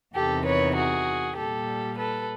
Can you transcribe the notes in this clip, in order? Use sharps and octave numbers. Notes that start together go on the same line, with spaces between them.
E2 C3 D#3 G4 A4
B4 C#5
F#4 G#4
A#2 G3 G4 A4
A4 B4